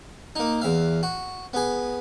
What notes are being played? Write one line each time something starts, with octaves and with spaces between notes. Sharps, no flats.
A#3 D#4
E2 E5 F5
F#4
B3 G#4